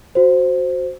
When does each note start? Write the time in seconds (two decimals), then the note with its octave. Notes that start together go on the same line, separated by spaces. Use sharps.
0.15 F#4 C5